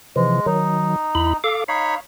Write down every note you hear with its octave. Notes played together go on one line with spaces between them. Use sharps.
C3 E3 F3 G#3
D#3 F#3 D#4
E2 E4 B5
A4 F5 D6
D#4 C#5 F5 B5